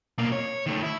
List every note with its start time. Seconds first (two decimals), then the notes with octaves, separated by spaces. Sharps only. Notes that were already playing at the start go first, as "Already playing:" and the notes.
0.18 B2 A#3
0.32 C#5
0.66 D#3 A3
0.83 E4